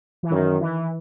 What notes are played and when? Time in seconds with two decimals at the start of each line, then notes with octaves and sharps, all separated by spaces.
0.23 E3
0.30 F#2 D#3
0.61 E3